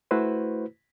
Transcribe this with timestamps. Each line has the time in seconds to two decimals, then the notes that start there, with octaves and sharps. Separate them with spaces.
0.11 A3 E4 F#4 B4 C5